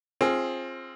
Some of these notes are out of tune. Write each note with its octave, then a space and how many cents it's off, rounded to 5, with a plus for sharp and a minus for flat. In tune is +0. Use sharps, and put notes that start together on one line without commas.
C4 +25 F4 -5 G#4 +10